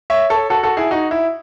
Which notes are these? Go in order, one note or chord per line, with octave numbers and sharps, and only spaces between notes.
C#5 E5
A4 C#5
F#4 A4
F#4 A4
E4 G#4
D#4 F#4
E4